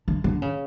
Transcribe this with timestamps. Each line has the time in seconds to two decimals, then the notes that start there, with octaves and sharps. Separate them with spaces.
0.08 D3
0.24 D3
0.42 C#3